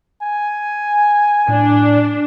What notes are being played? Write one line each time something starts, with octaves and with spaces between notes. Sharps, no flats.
G#5
A2 D4